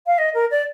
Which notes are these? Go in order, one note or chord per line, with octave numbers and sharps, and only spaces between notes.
F5
D#5
A#4
D5